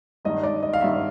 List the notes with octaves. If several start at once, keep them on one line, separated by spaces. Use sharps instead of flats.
G#1 G2 D#3 D#5
D5
D#5
F5
G#1 G2 D#3 E5